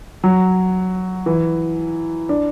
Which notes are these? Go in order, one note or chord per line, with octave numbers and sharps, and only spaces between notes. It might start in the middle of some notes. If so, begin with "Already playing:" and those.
F#3
E3
D4